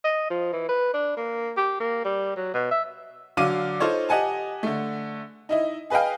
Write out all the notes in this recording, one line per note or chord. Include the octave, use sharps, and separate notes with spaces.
D#5
F3
E3
B4
D4
A#3
G4
A#3
G3
F#3
B2
E5
D3 F#3 F5 D6 D#7
D#4 F4 A4 C5 C#5
G4 D#5 F#5 G#5 A5
D3 A3
D#4 E4 D#5
G#4 B4 D#5 F5 G5